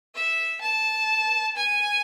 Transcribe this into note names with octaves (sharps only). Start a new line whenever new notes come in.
E5
A5
G#5